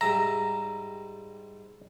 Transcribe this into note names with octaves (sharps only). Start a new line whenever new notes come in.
G#2 G3 E5 A#5